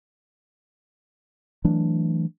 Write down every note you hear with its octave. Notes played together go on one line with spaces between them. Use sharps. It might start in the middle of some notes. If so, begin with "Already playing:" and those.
E3 F#3 A3 D4